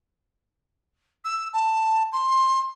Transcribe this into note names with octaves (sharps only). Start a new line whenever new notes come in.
E6
A5
C6